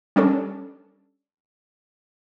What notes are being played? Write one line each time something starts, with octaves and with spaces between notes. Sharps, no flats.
G3 C#4 D4 A4